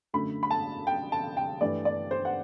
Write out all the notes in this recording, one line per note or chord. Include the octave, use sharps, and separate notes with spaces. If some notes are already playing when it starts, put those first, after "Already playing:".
F#2 D3 A3 B5
B5
A5
G5
A5
G5
G2 E3 A3 D5
D5
C5
F#5